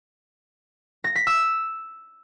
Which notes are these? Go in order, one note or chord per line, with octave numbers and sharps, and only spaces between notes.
A#6
B6
E6